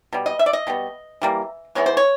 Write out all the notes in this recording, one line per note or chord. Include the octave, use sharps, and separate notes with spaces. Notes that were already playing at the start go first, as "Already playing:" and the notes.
B2 G3
D#5
E5
D5
D#5
B2 G3 B3
E3 G3 A#3
E3 G#3 B3 C#5
C5
C#5